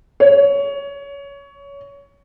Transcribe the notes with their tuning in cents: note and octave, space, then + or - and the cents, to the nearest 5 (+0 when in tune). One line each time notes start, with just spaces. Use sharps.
C#5 +20